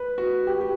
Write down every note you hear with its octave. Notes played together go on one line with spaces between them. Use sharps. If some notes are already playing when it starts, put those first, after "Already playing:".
Already playing: B4
F#4
G4
F#4
G4